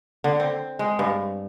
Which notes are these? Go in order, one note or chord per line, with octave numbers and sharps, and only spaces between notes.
D3
C4
G#3
G2